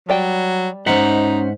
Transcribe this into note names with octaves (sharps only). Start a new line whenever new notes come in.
F#3 G3 D5 G5
G#2 C#4 D#4 C5 E5 F#5